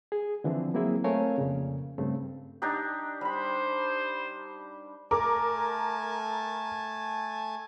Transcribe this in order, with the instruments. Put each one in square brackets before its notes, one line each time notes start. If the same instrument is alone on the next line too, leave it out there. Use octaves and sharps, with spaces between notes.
[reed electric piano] G#4
D3 E3 F3 C4
F#3 A#3 C4 E4 G#4
A3 C4 A#4 C#5 F5 G#5
F2 A#2 C#3
G2 C#3 A3 C4
[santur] D4 D#4 G4
[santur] G3 B5 [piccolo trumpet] C5
[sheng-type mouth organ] A3 G#5 A5 [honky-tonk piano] A#4 D6